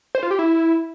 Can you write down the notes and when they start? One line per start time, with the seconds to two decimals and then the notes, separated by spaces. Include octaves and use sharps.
0.15 C5
0.23 F4
0.31 G4
0.39 E4